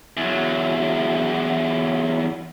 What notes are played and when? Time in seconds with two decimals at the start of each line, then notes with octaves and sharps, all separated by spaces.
0.17 E2 F#3